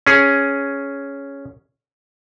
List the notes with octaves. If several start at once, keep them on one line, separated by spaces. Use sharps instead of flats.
C#4 G#4